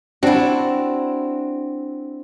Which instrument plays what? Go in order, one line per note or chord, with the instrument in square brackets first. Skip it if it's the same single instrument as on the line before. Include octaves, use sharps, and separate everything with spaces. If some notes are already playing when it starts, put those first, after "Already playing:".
[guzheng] C4 E4 [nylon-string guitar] D4 F#4